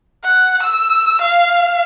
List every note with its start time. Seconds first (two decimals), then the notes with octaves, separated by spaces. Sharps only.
0.24 F#5
0.63 E6
1.22 F5